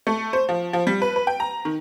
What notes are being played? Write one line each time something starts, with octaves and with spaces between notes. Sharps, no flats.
A3
C5
F3
F3
G3
B4
B4
G5
A#5
D#3